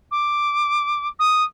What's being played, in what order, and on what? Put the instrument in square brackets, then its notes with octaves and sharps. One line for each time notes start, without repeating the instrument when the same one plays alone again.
[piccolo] D6
D#6